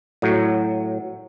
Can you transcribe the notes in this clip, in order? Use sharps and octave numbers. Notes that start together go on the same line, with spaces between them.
A2 F#3